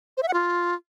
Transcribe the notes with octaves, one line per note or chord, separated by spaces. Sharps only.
C5
E5
F#5
F4